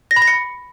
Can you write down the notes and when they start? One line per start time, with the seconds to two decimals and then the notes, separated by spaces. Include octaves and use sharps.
0.11 A#6
0.16 B5
0.22 A#6
0.28 C#7